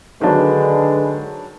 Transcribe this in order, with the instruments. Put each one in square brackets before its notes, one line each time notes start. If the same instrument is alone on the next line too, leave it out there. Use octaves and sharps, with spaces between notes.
[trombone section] D3 G#3 B4 [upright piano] D#3 F#3 D4